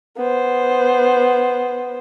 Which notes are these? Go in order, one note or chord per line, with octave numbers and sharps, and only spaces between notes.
B3 C5